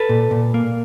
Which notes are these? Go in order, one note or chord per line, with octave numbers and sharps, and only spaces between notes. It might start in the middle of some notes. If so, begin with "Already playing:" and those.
Already playing: A4 B4
A#2
A#2
A#3